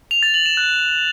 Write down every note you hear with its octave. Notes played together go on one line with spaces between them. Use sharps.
F7
A6
F#7
E7
F#6